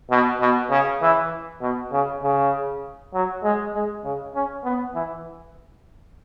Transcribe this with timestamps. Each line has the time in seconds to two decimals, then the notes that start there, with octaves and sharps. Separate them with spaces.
0.11 B2
0.40 B2
0.70 C#3
1.02 E3
1.61 B2
1.92 C#3
2.23 C#3
3.14 F#3
3.43 G#3
3.74 G#3
4.04 C#3
4.34 C#4
4.64 B3
4.94 E3